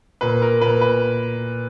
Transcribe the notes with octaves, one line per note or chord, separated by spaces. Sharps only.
A#2 B4
A#4
A#2 B4
B4